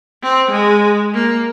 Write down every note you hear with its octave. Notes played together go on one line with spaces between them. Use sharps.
C4
G#3
A#3